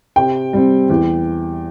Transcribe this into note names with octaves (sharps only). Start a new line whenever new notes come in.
C3 G5
G3 C4
E2